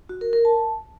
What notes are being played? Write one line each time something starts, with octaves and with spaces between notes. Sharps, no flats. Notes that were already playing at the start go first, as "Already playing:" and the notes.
F#4
A#4
A#4
A5